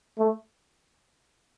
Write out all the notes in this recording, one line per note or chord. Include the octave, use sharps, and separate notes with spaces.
A3